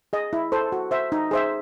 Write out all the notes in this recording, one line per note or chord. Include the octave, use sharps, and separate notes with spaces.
G#4 D#5
E4
A4 C5
F#4
C5 E5
D#4
G#4 C5 E5